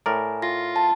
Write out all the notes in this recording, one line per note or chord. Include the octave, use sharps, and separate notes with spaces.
A2 A#4 D5 G#5 A#5
F4 A#6
A5